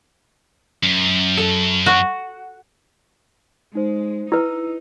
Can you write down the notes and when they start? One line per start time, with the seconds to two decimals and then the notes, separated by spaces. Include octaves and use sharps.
0.83 F#2
1.37 A4
1.86 F#4
3.75 G#3 D#4 C5
4.32 D#4 E4 B4 E6